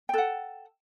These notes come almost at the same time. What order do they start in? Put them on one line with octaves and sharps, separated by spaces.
G5 A4 F#5